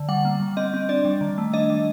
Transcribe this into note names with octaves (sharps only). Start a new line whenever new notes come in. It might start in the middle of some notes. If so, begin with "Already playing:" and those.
Already playing: D3
G3 F#5
A#3
G3
C4 D#5
C4
D4 D5
G3
D#3
A3
D4 D#5
G3